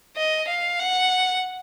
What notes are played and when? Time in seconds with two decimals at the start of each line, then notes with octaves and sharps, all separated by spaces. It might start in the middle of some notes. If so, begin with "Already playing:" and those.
0.17 D#5
0.48 F5
0.80 F#5